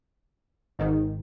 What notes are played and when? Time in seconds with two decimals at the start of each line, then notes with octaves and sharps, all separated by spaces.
0.79 G#1 G#2 D#3